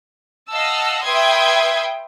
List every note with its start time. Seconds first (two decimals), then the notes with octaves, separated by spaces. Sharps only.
0.49 D#5 F5 F#5 A5 E6
1.04 B4 E5 G5 C6 D#6 G#6